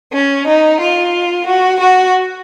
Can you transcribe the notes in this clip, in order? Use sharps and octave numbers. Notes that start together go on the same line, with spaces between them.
C#4
D#4
F4
F#4
F#4